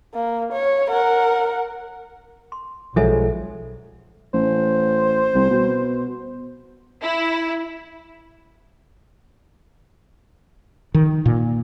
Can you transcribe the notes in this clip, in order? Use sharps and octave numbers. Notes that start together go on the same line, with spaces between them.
A#3
C#5
A#4 F#5
C6
B1 F3 F#3 G#3 A4 E5 G#5
A1 C5
C2
B2
E4
D#3
A#2